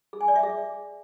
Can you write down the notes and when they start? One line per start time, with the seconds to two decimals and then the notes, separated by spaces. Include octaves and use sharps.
0.13 G#4
0.21 G#5
0.28 D5
0.36 E5
0.43 G#4